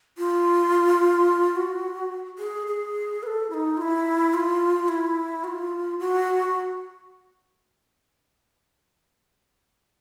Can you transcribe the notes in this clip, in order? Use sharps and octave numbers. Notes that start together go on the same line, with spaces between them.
F4
F#4
G#4
G#4
B4
A4
E4
D#4
F4
E4
F4
E4
F#4
F4
F#4